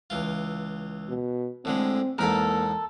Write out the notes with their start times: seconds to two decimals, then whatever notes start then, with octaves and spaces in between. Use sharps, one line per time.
0.10 C#2 E3 F4
1.09 B2
1.65 A2 D3 G#3 C4
2.18 E2 G#2 A#3 A4 A#4 B5